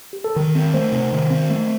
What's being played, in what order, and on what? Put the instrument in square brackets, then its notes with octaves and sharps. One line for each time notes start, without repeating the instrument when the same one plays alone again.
[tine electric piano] G4
A4
[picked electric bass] D#3 [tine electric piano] A#4
[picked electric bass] C4
[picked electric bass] A3 [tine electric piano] C5
[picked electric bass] C3
D#3
C4
A3